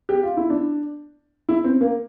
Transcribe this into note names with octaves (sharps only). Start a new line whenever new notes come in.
G4
F4
E4
D4
E4
C4
A#3